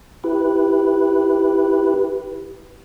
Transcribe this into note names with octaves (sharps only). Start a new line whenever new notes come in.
E4 G4 B4